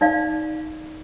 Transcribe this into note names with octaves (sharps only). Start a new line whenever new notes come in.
D#4 D5 F5